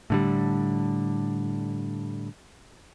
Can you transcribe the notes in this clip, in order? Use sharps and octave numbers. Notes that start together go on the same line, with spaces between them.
A2 D3 G3